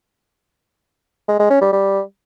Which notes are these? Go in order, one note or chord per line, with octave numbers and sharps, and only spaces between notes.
G#3
G#3
C#4
G3
G3